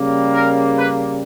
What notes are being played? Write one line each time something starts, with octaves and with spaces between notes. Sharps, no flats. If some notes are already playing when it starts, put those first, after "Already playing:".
Already playing: C#3 G3 A#3
A#4
B4